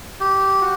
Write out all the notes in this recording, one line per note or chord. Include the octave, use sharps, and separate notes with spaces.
G4
F#4